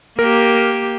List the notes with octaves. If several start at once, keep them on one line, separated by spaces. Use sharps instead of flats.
A#3 G4 A#4